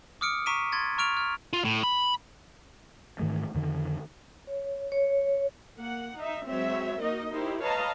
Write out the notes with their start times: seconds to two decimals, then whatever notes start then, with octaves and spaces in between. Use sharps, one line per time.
0.21 D6 D#6 F6 C#7 D7
0.46 A#5 C#6 B6 D7 D#7
0.72 C6 G#6 A6
0.98 A#5 C#6 F6 D7 F7
1.17 F6
1.53 F4
1.65 A2
1.84 B5
3.19 G#2 D#3 E3 A3
3.54 F2 D3 D#3
4.47 C#5
4.92 C#5
5.79 A#3 F#5
6.18 D#4 E5
6.48 F#3 G#3 C4 C#5 E5
7.01 A#3 D#4 F#4 A#4 D#5
7.32 D#4 E4 G4 A#4 C5
7.63 B4 C#5 D#5 F5 A5 A#5